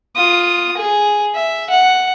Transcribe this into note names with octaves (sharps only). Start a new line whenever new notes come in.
F4 D#6
G#4
E5
F#5